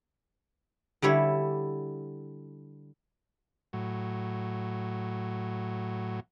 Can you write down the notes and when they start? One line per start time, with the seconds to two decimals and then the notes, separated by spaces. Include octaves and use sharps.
1.02 D3 G3 E4 C#5
3.73 A2 F#3